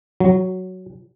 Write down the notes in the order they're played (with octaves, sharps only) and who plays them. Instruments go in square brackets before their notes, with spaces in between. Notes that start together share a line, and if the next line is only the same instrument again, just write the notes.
[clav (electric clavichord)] F#3